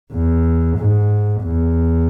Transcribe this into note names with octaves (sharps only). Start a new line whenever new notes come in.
E2
G#2
E2